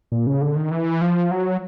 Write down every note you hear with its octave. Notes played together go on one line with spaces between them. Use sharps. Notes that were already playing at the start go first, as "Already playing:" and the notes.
A#2
C#3
D3
D#3
E3
F3
F#3